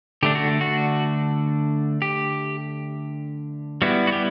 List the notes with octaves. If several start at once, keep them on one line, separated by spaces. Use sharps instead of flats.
D3 A3 D4 G4
F#4
F#4
G4
G3 B3 E4 F#4
F#4
G4